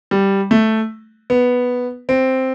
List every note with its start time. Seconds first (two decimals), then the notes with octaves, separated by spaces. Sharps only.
0.11 G3
0.51 A3
1.30 B3
2.09 C4